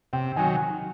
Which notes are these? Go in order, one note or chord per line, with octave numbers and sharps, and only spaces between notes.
C3 G5
D#3 F#3 G#5